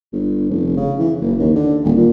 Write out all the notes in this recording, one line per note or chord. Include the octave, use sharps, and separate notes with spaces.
G1
F1
C#3
E3
F#1
D#2
D3
D#1
A#2